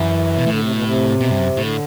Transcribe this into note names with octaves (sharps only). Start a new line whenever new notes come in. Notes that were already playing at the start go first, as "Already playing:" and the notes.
Already playing: F#2 E3
B2
A2 D3
C3
B2
D3
C3
B2
G2
F#2
A2 D3